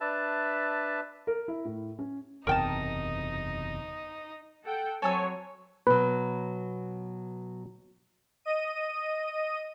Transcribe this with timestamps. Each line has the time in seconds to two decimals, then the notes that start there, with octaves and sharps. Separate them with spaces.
0.01 D4 B4 E5 A5
1.27 A#4
1.48 E4
1.65 A2
1.99 C#4
2.47 F#1 E2 C3 D#4 A#4 D#5 G5 A5
4.64 A4 F#5 G5
5.02 F#3 C4 A4 C#5 G#5 E6
5.87 B2 F#3 B4
8.45 D#5 D#7